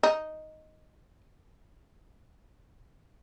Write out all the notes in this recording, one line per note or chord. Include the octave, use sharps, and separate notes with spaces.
D#4